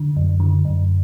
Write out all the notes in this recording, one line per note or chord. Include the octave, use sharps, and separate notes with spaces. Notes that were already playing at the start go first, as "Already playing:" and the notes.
Already playing: D3
F#2
D3
F#2